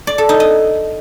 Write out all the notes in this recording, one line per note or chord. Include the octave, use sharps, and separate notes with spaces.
D5
A4
D#4
D#5